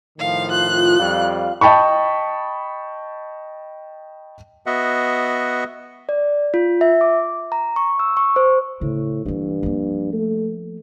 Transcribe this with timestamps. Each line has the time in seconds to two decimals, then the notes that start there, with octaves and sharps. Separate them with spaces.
0.19 A2 D#3 F3 F5
0.51 F4 F#6
1.00 F2 G3 F4 F5
1.61 D#5 G5 A5 B5 C#6
4.66 B3 F#4 D#5 E5 F#5
6.09 D5
6.54 F4
6.81 E5
7.01 D6
7.52 A#5
7.76 C#6
7.99 E6
8.17 C#6
8.36 C5
8.81 A2 C#3
9.25 G2 E3 A#3
9.63 F3 A#3
10.13 A3